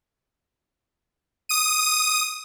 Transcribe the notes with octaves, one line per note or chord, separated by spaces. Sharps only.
D#6 D#7